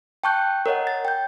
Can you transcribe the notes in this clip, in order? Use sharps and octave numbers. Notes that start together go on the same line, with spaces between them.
G5 A5 C#6 F#6 G6
A#4 C#5 D#5 F#5
A6
G5 G6